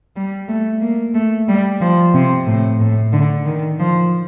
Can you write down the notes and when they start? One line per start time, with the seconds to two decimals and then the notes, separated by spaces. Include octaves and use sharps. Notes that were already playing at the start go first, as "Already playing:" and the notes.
0.16 G3
0.49 A3
0.81 A#3
1.15 A3
1.48 G3
1.81 F3
2.14 C3
2.47 A2
2.80 A2
3.13 D3
3.46 D#3
3.79 F3